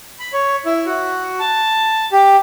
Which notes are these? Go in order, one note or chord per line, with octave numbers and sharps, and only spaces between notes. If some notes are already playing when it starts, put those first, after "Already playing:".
B5
C#5
E4
F#4
A5
G4